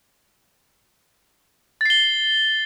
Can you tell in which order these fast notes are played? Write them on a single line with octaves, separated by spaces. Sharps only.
A6 C7 G7